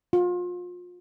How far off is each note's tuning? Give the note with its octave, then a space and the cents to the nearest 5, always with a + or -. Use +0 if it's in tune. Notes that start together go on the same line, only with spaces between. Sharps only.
F4 +30